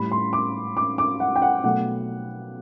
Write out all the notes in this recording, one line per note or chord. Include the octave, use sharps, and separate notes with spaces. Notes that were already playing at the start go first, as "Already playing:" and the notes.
Already playing: A2 G3 B5
C6
D6
D6
D6
F#5
G5
F#5
B2 F#3 A3 F#5